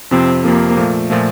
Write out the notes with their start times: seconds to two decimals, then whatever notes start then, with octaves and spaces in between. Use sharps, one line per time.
0.11 F2 C3 F3 C4
0.44 F2 C3 F3 A#3
0.77 A#2 F3 A3
1.10 A#2 F3 A3